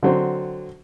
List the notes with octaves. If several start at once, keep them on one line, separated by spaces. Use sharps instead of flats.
D3 F#3 C4